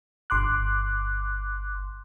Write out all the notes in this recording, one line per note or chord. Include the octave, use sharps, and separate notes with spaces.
G1 C6 D6 F#6